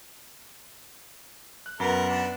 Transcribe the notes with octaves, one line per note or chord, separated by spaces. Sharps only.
F#6
F#2 B3 A#4
D4